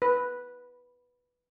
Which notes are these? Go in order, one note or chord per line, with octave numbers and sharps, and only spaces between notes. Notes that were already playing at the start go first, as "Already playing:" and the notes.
B4